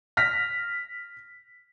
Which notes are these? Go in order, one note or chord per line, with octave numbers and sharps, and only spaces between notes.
F6 A#6 B6